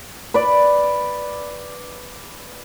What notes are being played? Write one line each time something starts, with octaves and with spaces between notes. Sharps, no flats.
B4 D5